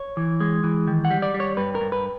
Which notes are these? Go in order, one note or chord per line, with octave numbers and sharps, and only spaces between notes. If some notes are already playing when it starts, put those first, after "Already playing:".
Already playing: C#5
E3
G#3
E3
D#3
F#5
G3
D5
G3
C#5
G2 B4
A#4
G2
B4